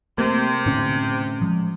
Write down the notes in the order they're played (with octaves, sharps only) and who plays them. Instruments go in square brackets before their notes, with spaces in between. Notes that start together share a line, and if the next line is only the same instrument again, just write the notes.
[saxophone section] C3 [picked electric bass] A3 A#3
[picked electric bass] A2 D3 C#4
F3 G#3